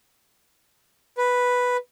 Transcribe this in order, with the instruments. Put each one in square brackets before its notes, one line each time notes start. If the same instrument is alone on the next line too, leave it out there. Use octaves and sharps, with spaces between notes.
[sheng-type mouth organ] B4